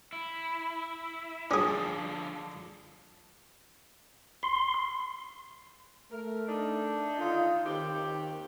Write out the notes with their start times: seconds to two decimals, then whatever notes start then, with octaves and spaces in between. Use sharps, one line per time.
0.13 E4
1.51 D3 F3 C#4 G#4
4.43 C6
6.12 A3 A#4
6.48 D4 D#4
7.19 D3 D#3 D#4 F4
7.65 D#2 D#3 C4 G4